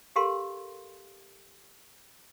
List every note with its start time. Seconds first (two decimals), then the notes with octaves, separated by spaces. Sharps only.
0.16 G4 A4 A#4 F5 C6